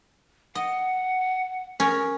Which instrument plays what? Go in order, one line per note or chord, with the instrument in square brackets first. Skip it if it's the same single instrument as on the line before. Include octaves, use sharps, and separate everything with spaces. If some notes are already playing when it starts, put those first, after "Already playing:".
[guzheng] D#5 [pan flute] F#5
[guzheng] C#4 A#4 [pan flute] G#4